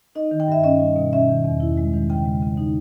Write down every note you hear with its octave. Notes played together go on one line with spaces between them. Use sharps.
D#4 D#5
D#3
G5
G2 E5
C#4 D#5
G3
B2
C#4 E5
D#3
E2
E4
G#3
D#3
C#3 G5
G#3
C#3
D#4